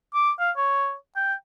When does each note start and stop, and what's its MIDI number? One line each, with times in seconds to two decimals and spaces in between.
0.14 0.31 86
0.40 0.51 77
0.57 0.94 73
1.16 1.34 79